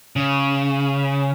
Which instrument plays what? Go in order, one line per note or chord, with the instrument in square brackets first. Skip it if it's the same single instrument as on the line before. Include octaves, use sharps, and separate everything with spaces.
[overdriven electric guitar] C#3